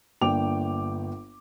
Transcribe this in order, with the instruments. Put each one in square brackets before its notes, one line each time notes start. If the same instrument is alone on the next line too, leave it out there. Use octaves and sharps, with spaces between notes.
[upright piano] G1 A#3 D4 G5 D6 F7